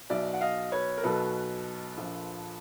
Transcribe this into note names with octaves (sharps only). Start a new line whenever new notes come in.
B1 B2 F#3 D5 E5
F#5
D#5 F5
B4 C#5
A#4
B1 B2 F#3 A4 B4
A#1 A#2 F3